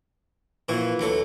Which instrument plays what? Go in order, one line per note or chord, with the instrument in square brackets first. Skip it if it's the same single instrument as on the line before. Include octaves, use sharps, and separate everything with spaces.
[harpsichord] A#2 F3 F#4 [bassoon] E3
[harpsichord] D2 F#3 A4